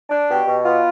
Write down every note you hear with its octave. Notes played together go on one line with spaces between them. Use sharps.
D4
B2 G4
B2
B3 F4